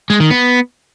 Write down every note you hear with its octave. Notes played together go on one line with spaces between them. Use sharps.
G#3
D#3
B3